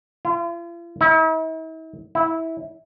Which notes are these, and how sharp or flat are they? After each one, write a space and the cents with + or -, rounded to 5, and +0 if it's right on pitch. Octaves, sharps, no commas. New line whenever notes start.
F4 -45
E4 -45
E4 -15